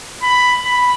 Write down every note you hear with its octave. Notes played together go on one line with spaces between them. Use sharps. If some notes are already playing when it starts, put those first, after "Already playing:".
B5
B5